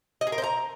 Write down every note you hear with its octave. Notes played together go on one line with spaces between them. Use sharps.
D#5
G#4
A#4
C5
A#5